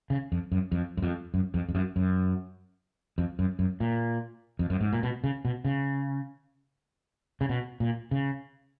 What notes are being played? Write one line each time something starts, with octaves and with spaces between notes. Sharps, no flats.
C#3
F2
F#2
F2
F#2
F2
F#2
F2
F2
F#2
F#2
F2
F#2
F#2
A#2
F2
F#2
G#2
A#2
B2
C#3
B2
C#3
C#3
B2
A#2
C#3